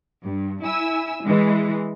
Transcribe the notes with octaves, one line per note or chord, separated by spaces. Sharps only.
G2
E4 G#5 E6
E3 G#3